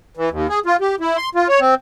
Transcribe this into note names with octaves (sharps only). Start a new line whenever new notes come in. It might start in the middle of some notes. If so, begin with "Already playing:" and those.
E3
D#2
G#4
F4
G4
E4
C6
F4
C#5
C4